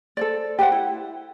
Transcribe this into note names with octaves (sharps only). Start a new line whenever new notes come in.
A4 C5 D5
G4 B4 C5 F#5
E4